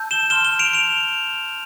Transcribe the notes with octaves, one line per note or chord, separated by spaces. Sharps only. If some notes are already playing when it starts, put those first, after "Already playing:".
Already playing: A5 E6 G6
E7 G7
A5 C6 F6 E7 G7
E7 G7
D7 F7
D7 F7